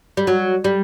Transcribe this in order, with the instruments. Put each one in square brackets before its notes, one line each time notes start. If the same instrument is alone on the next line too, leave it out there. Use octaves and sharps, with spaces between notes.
[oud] G3
F#3
G3